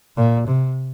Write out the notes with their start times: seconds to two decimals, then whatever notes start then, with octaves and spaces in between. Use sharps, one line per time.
0.17 A#2
0.47 C3